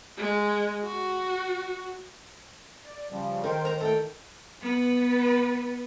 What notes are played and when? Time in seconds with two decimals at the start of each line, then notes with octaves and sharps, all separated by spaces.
0.17 G#3
0.84 F#4
2.85 D5
3.11 C#3 F3 G3
3.44 D#3 A#4 C5 G5
3.65 A#4 C5 A#5
3.80 A2 A3 A4 A#4 G5
4.62 B3 B4